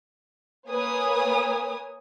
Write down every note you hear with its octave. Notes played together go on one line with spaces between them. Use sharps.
A#3 B4 C#5 G#5 D#6